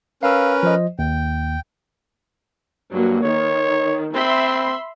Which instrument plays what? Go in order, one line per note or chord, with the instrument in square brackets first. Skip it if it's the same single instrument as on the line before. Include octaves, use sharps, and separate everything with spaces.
[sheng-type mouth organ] C#4 A#4 B4 [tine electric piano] F5 E6
[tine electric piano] F3 C5 D#5
[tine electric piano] D#2 [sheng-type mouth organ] G5
[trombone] G2 [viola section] F#3 A#3
[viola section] D#3 [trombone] C#5
[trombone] C4 [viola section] E5 B5 C6